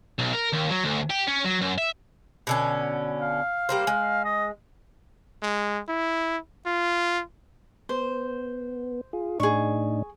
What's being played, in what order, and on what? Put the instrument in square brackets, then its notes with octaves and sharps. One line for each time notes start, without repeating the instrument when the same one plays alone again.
[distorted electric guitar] B1
A#4
D#2
F#3
D2
G4
C#4
F#3
F#2
E5
[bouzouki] B2 D3 C#4
[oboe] F5
[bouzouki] G3 A#3 C5
G#3
[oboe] D#5
[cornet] G#3
E4
F4
[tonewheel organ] B3 [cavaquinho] C5
[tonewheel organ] F4 G#4
[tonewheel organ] A2 D4 D#4 [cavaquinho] G#4 C#6